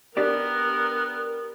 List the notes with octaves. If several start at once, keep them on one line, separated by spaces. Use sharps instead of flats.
B3 D4 G4 A#4 D5